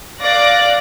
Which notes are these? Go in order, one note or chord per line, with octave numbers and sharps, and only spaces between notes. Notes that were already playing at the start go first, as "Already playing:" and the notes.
D5 F5 D6 F#6 A#6